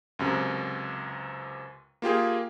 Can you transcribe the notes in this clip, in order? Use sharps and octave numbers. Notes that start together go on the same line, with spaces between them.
C#2 F#2 C3
A#3 F4 G4 G#4